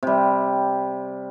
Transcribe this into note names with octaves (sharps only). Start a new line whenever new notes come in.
C3 G3